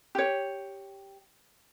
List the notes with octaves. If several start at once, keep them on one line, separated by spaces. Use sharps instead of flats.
G4 C#5